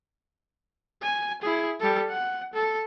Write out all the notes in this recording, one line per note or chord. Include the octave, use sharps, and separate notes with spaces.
G#5
E4 G#4
G3 A4
F#5
A4